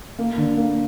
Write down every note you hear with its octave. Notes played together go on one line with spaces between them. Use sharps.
A#3
D3
A#3